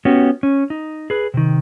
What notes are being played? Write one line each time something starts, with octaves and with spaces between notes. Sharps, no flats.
B3 C#4 F#4 G4
C#4
D#4
G#4 B4
C3 D#3